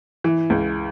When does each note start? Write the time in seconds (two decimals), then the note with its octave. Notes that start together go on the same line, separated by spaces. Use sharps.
0.24 E3
0.50 C#2